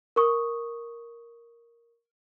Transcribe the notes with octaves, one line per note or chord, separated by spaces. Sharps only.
A#4 C#6 D#6